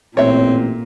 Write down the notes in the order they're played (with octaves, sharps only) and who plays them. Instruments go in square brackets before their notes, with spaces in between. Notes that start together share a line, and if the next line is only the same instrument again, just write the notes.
[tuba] A1 [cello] A#2 [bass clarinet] C4 [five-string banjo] C#5 E5